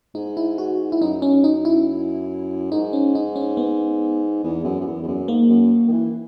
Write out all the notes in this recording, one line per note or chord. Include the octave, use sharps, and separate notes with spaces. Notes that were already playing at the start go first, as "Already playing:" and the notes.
G#2 D#4
E4
F#4
E4
F#2 D#4
C#4
D#4
E4
G#2 D#4
C#4
D#4
C#4
B3
E2
F#2
F#2
E2
E2
F#2
G#2 A#3
F#2
D#3
E3